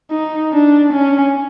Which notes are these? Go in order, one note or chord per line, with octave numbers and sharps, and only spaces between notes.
D#4
D4
C#4